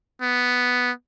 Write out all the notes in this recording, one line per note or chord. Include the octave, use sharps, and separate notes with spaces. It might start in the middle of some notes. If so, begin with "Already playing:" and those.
B3